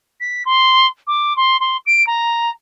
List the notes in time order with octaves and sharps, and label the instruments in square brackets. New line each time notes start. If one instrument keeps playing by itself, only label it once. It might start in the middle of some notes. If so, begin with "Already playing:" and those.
[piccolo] B6
C6
D6
C6
C6
D7
A#5